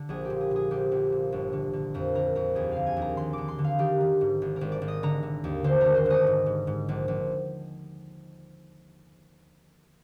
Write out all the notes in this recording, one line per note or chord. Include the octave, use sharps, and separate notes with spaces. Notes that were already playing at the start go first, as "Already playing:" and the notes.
Already playing: D3
A#1 G#4
G4
A#2
G#4
A#2 G#4
A#1 G4
A#1
A#2
G1
D3
D3
F2 A#4
D3 A#4
F2 A#4
D#2 G#4
D3 F5
G#5
D#2
A#5
D#2 C6
D3 D6
C6
D3
F5
D#3 G4
D#3
G#2
G#1
G#1 A#4
D5
G#1
D#5
D3 A#5
D3
D#2
D3 C5
D3 A#4
C5
D3 D#5
G#2
G#2
G#2
A#1
A#1